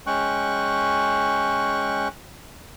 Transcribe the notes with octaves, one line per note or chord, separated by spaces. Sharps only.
G#3 C#4 G5 C#6 F#6